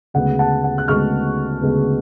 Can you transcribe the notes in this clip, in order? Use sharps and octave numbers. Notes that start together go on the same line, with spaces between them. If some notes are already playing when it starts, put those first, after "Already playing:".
D2 C#3 G#3 B3 F#5
F#5 A5
F#5
F#6
D2 C#3 G#3 B3 C#6 F6
D2 C#3 G#3 B3